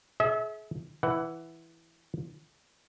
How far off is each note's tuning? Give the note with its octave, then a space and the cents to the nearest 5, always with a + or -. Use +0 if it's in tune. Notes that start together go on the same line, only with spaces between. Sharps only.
G#4 +40 E5 -30
E3 +0 F#5 +15